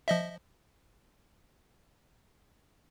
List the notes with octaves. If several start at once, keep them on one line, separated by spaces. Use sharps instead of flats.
F3 D#5 E5